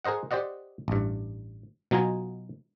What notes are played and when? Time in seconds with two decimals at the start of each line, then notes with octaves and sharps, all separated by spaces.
0.04 G#4 A#4 C5 D#5 F#5
0.31 G4 C5 D5 D#5 F#5
0.88 A1 G2
1.91 B2 F#3 D#4 F4 G#5 A#5